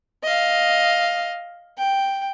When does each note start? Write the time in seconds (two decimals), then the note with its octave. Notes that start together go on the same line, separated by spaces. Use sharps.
0.24 D#5 F5
1.78 G5